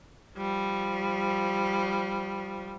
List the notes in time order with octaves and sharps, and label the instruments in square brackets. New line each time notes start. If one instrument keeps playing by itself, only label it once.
[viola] F3 G3